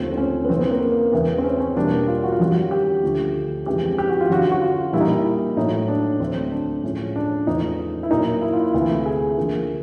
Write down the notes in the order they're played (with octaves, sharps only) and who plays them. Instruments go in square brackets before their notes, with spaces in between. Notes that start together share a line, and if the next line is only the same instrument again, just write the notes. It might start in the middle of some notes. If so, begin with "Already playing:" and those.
Already playing: [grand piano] D#2 D3 F3 A3 C4
C4
C#4
B3
F#2 C#3 E3 C4
B3
A#3
A#3
E2 C#3 E3 G#3 B3
C4
C#4
C#4
E2 B2 G3 A#3 D4
F4
F#4
F4
F#2 D#3 G3 F#4
G4
D2 D3 F3 A3
F2 C#3 E3 G#3 G4
G4
F#4
F4
F#2 D3 F#3 F#4
F#4
F4
A#2 G3 A#3 E4
D#4
E4
A2 F#3 A3 D#4
D4
D2 D3 F#3 A3 C4
D4
A2 F3 G#3 C#4
D4
E2 C#3 F3 A3 D#4
E4
A#2 F#3 A#3 D#4
E4
F4
E4
D2 C3 E3 A3
G#4
D2 D3 F3 A#3